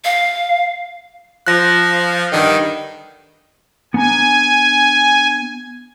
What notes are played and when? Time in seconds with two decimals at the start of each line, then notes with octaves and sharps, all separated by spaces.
0.05 F5
1.47 F3 F#6 A#6
2.32 G2 D3 D#3
3.94 B3 D4 G#5 A#5